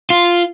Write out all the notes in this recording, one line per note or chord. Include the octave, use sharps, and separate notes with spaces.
F4